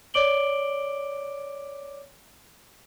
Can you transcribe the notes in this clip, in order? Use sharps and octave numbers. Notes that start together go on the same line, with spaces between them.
C#5 D5 D6 D7 F#7 G7